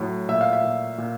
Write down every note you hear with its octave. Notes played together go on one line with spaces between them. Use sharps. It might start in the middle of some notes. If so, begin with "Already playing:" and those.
Already playing: A2 F#3
A#2 E5
F5
E5
A#2
A#2